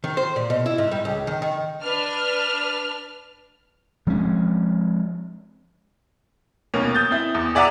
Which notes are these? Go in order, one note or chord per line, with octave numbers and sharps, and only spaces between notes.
D#3
C5
A#2
B2
E4
G#2
G3
C#2
D#3
D#3
D4 B4 F6
F3 G#3 C4 C#4
D#2 B2 A#3 C#4
D#6 G6 A6
C4 E4
E2
G#4 D5 E5 F#5 G#5 A#5